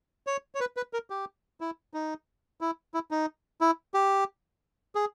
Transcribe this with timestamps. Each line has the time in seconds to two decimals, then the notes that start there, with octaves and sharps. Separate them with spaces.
0.27 C#5
0.55 C#5
0.60 B4
0.77 B4
0.93 A#4
1.10 G4
1.61 E4
1.94 D#4
2.61 E4
2.94 E4
3.11 D#4
3.61 E4
3.94 G4
4.95 G#4